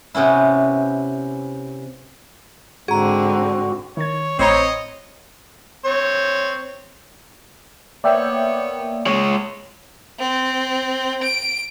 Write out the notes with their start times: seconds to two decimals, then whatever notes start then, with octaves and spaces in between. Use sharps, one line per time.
0.14 C3 B3 C#4 E4
2.88 G#2 D3 C4 F#4 G#4 A#5
3.97 D#3 C#5 G#6
4.39 A1 C4 C#5 D#5 A#5 B5
5.85 C4 C#5
8.04 A#3 B3 C#5 D5 E5 G5
9.07 G#3 C#5
10.19 C4
11.23 D7